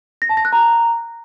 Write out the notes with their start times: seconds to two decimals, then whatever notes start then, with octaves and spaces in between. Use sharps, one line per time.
0.22 A#6
0.29 A5
0.37 A#6
0.45 F#6
0.53 A#5